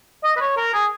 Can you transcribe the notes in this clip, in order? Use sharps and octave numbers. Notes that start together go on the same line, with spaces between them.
D#5
B4
C#5
A#4
G#4